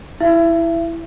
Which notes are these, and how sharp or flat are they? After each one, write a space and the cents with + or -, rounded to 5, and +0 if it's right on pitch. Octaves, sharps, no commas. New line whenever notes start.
E4 +0 E5 +30